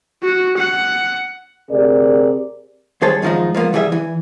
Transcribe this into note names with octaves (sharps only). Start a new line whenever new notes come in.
F#4
F#5
D2 C3 G#4 A#4 D5
D#2 G3 G#4 C5 C#5 A5
F#2 D#3 F3 G#3 D#4
F3 G#3 A#3 B3
C2 E3 G3 G#4 E5
E3